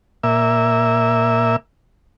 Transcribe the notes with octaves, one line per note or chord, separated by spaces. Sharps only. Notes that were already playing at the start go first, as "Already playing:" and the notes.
A#2 E5